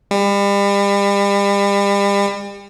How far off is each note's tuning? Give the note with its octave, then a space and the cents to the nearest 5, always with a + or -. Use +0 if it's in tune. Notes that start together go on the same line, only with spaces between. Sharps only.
G3 +35